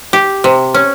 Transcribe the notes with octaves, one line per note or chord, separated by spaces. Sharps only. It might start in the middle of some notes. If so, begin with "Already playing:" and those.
G4
C3
C#4